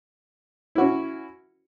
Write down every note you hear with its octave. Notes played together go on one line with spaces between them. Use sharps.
C#4 E4 F#4